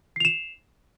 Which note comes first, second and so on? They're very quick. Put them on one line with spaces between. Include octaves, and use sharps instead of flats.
C7 F7 E7